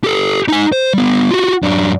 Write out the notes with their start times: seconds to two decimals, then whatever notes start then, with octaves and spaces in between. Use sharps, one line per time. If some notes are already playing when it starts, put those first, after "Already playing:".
0.04 G4 A4
0.48 D#4 G#5
0.72 C5
0.94 G3 B3
1.31 F4 F#4
1.63 F#2 D4